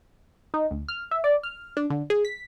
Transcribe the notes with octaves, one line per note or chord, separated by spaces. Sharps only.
D#4
D2
F6
E5
D5
F6
D4
D3
G#4
B6